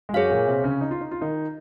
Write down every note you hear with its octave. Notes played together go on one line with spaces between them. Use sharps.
G#3
F#2 F#3 G#4 C#5 F5
A#2 A#3
C3 C4
C#3 C#4
D#4
F4
D#4
F4
D#3 D#4